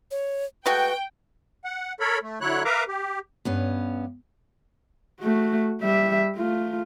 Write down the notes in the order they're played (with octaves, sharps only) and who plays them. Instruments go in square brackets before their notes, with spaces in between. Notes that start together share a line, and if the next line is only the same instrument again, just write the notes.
[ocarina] C#5
[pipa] G#3 A3 F#4 [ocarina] B4 [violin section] G5
[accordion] F#5
A4 A#4 C#5 B5
A3
D3 F#3 E4 C#5 F#6
A#4 B4 E5 F5 A#5 D6
G4
[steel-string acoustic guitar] G2 B3 C#4
[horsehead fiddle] A3 F#4
G3 E5
A3 F4